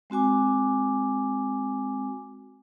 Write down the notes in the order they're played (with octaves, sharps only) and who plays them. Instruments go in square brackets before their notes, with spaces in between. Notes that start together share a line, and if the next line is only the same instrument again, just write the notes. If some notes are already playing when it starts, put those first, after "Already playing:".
[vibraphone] G#3 C4 F#4 G#5 D6